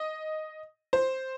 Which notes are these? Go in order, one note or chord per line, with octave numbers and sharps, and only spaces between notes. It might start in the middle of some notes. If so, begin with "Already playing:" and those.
Already playing: D#5
C5